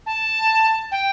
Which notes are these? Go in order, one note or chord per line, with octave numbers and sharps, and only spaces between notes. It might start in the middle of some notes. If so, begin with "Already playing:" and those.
A5
G5